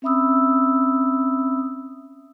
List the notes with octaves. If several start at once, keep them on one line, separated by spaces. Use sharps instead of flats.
C4 C#4 E5 B5 D#6 E6